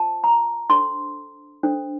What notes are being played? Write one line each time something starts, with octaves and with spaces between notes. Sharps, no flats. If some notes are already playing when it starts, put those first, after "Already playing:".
Already playing: F4 C5 A5
A#5
D4 A4 C5 C6
D4 A4 C5